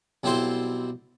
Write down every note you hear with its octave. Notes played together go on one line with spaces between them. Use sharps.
B1 G3 C4 E4 C5 C6